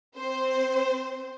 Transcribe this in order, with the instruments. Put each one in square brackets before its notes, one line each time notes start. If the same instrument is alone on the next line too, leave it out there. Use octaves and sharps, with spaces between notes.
[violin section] C4 C5